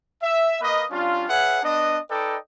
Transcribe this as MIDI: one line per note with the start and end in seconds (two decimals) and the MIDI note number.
0.22 0.58 76
0.61 0.84 58
0.61 0.84 71
0.61 0.84 75
0.91 1.28 55
0.91 1.28 61
0.91 1.28 62
0.91 1.28 65
1.29 1.63 68
1.29 1.63 71
1.29 1.63 73
1.29 1.63 76
1.29 1.63 78
1.63 1.99 59
1.63 1.99 62
1.63 1.99 75
2.11 2.36 63
2.11 2.36 69
2.11 2.36 71
2.11 2.36 74
2.11 2.36 75
2.11 2.36 79